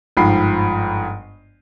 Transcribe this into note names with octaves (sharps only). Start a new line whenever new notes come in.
G1 G#2 F3 G5 B5 C7